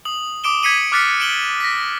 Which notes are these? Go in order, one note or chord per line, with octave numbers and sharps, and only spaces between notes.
D#6 F#7
D6 D#6 D7 E7 G7
G#6 B6 C#7 D#7 F#7
D6 F6 F#6 A6 B6 C#7
D7 E7 F#7 G7
A#6 B6